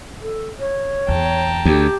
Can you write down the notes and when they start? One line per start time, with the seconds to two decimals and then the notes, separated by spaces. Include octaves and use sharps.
0.21 A4
0.60 C#5
1.09 E2 G5 A5 A#5
1.65 D2 G4